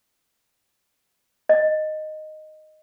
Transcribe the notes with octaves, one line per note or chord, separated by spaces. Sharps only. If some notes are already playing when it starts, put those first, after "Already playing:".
D#5